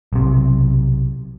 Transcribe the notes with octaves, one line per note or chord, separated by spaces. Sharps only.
B1 C3